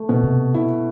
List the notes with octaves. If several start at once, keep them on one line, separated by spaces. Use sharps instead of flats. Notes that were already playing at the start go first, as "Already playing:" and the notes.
Already playing: A3
B2
C3
E4